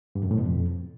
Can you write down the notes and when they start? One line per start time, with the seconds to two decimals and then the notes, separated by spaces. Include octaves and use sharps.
0.15 G2
0.23 F#2
0.31 A2
0.38 B2
0.46 F2